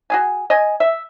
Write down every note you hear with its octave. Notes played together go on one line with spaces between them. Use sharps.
F#4 G#4 G#5
D#5 G#5
E5